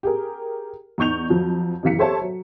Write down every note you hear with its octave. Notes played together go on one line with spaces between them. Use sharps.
G4 G#4 A#4
E2 D#4 C#6 G6 F7
F2 F3 F#3
F#2 C3 E3 F5 B6 C#7
G4 A4 C5 C#5 E5 A5
F#3